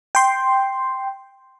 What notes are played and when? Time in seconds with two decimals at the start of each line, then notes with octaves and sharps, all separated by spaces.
0.15 G5 C6